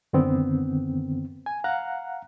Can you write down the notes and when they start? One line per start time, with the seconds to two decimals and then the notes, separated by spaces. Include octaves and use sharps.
0.13 F#2 D3 D#3 B3 C4
1.46 G#5
1.64 F5 F#5 A#5 F#6